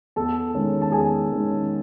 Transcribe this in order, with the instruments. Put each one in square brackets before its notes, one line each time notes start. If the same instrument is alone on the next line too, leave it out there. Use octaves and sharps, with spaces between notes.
[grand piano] E2 A4 A5
D#3 G#3 C#4
A5
E2 G#4 G#5
D#3 G#3 C#4